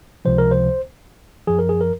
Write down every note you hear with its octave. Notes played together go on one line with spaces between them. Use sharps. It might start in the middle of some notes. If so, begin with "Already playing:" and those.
C#2 C3 F3 C5
A#4
C5
F#2 F3 G#4
A#4
G#4
A#4